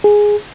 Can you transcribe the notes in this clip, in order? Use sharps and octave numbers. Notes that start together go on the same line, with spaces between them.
G#4